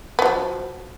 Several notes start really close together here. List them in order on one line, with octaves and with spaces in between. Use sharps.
B3 F#3 F3